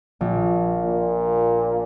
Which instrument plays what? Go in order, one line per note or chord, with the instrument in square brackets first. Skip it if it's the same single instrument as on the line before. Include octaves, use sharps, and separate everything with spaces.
[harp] A#1
[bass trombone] A#2